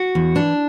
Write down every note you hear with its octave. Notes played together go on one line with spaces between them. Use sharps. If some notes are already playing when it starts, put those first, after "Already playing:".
Already playing: F#4
E2
E3 D4